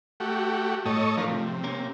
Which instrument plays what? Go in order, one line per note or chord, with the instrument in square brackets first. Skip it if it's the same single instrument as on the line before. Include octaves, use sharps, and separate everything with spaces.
[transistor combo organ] A3 F#4 G4
[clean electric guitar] A2 [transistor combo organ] A4 C#5 D#5
[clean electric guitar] F3 A3 [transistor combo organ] D4 F4 A#4
[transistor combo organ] C3
[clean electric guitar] A#3 C#4 A#4